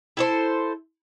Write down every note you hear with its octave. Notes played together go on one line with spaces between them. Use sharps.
E4 A4 C5